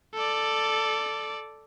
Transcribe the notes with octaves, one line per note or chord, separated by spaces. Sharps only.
A4 D5